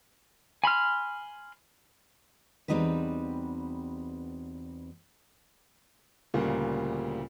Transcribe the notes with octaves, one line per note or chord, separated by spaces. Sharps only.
G#5 B5 C6 F6
E2 G3 C4 D#4 F#4 B4
D2 A#2 C#3 G3 A#3